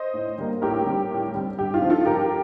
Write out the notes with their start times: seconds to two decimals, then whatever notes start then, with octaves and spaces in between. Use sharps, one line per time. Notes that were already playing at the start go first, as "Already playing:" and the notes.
Already playing: C5 D#5
0.14 A2
0.38 G3 A#3
0.62 A2 G4 A#4
0.86 G3 C4
1.10 A2
1.34 G3 C4
1.59 G2 G4
1.74 F4
1.81 F3 C4
1.90 F4 A4
2.06 G2 G4 A#4